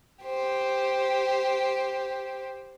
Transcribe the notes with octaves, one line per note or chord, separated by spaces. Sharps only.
G4 C5